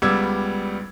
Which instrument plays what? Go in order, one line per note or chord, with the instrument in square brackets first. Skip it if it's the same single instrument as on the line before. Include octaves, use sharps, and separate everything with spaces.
[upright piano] C#2 G3 B3 D5 E6 G#6